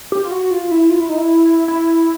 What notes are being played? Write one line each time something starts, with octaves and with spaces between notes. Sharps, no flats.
G4
F4
F#4
F4
E4
F4
E4
D#4
E4
E4